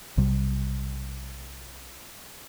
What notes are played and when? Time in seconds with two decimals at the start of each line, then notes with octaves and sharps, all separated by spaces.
0.17 B1 C3 G3